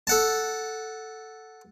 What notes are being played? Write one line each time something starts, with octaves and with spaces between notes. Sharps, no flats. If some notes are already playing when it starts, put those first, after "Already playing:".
A4 F#5 A5